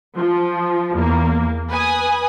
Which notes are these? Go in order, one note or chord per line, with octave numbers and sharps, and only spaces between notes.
F3
E2 A#3
B4 G#5 D#6